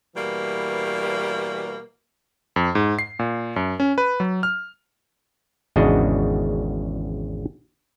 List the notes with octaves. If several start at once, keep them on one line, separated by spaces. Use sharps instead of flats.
B2 E3 G3 A#3
F2
G#2
C7
A#2
F#2
C#4
B4
F#3
F6
G#1 E2 C#3 D4 F#4 D#5